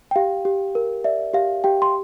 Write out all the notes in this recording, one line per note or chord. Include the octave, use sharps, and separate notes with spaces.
G5
G4 F5
G4
A#4
D5 E5
G4 F5
G4 G5
C6